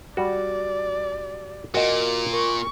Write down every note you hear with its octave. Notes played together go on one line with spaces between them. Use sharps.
G3 F#4 D5
A#2 F#4 A#4 D#5
A#4 C#6